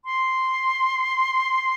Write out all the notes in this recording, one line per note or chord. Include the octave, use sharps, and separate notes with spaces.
C6